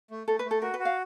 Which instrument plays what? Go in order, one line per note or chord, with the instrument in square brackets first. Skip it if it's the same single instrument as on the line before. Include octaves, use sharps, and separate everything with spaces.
[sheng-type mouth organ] A3
[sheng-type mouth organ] A3 [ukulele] A4
[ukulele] B4
[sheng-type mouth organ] A3
[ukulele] A4
[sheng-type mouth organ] F#4 [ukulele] A#4
[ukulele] B4
[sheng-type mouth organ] F#4
[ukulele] F5